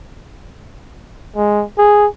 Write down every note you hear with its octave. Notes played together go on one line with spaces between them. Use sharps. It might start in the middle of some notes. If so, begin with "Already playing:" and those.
G#3
G#4